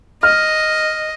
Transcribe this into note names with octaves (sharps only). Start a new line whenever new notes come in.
D#5 F6